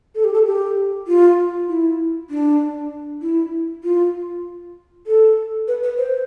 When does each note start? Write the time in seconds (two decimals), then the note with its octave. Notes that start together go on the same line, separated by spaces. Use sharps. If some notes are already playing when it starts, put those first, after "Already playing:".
0.15 A4
0.24 G4
0.34 A4
0.46 G4
1.07 F4
1.69 E4
2.30 D4
3.22 E4
3.84 F4
5.07 A4
5.68 B4
5.83 B4
5.98 C5